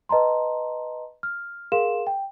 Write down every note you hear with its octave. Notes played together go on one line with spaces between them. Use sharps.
B4 D#5 A5 A#5 C6
F6
G#4 A#4 F5 C6 E7
G5